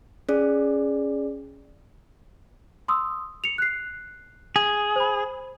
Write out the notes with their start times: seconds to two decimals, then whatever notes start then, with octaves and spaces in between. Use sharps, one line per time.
0.29 C#4 G#4 D5
2.88 C6 D#6 E6
3.44 C#7 F7
3.58 F#6 C7
4.56 G#4
4.96 C5 B5